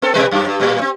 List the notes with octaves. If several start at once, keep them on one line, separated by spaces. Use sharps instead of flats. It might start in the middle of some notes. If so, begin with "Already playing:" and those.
B3 A4
B2 G3 B4
F#2 G4
G2
A2 G3
C4